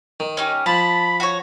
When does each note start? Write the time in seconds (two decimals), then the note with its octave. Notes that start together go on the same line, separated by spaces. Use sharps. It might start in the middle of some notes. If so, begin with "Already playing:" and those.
0.20 D#3
0.37 C#4 D#4 G4
0.66 F3 A5 B5
1.20 F#4 C#5